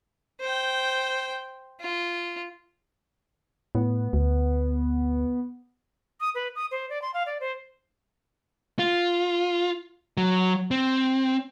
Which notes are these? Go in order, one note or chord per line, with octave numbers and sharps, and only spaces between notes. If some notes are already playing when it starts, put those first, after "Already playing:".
C5 G5
F4
A2 B3
D2
D#6
B4
D#6
C5
D5
C6
F5
D5
C5
F4
F#3
C4